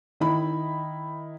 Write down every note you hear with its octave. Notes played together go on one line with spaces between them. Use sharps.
D#3 D#4 E4 B5